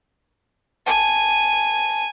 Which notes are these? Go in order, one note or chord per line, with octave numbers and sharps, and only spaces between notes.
G#5 A5